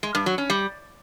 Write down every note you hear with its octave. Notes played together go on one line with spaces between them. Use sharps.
G#3
G2
F#3
C#4
G3